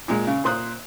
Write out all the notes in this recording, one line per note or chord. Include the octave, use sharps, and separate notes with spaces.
A#2 G#3
C#3
A#2 C5 D#6 F#6